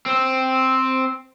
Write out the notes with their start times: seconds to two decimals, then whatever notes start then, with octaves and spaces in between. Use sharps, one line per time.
0.06 C4